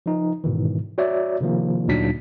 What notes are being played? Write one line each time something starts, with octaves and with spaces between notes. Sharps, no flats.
F3 D#4
G#2 B2 D#3 E3
F#4 C#5 D5 E5
C3 D#3 F3 A#3
D2 A#2 F#3 D4 D#4 B6